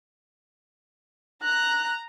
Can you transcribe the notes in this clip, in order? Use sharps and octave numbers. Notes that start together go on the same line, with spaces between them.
A#5 F#6